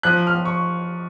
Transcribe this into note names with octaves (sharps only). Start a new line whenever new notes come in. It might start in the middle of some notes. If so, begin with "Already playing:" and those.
F3 F#6
F6
F3
C#6